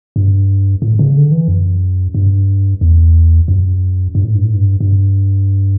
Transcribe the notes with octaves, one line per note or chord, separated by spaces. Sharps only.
G2
A2
C#3
D3
E3
F#2
G2
E2
F#2
G2
A2
G2
A2
G2
G2